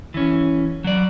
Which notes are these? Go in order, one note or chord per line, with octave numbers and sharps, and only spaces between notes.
E3 C#4
F#3 D5